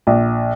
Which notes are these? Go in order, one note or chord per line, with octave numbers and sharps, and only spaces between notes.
A#1